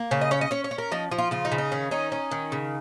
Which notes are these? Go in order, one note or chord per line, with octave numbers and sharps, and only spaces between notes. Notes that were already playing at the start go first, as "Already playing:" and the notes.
Already playing: A#3
C#3 C#5
D#5
C#4 C#5
D#5
C#4 C#5
C#5
C#4
A#4
F3 D#4
F3
F4
C#3 F4
D#4
C#3
D#4
D#3 C#4
C#4 D#4
C#4
D#3
C#3